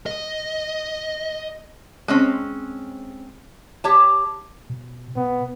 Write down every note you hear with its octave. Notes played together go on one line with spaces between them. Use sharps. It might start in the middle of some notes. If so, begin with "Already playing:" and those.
D#5
G#3 C4 C#4
G4 C#5 A5
B2
B2 B3